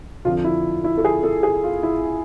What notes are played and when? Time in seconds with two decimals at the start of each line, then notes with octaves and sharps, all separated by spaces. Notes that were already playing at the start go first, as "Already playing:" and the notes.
0.25 F2 D3 F3 F4
0.44 E4
0.84 E4
0.98 A4
1.05 G#4
1.23 A4
1.43 G#4
1.64 F4
1.83 E4